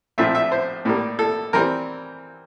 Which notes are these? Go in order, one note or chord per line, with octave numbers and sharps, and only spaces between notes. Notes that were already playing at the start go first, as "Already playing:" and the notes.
A#1 A2 F3 A3 C4 E5
E5
C5
A2 G3 A#3
A4
E3 G3 C4 A#4